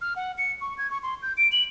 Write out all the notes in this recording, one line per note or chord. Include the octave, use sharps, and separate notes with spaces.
F6
F#5
C#7
C#6
G#6
C#6
C6
G6
D7
F#7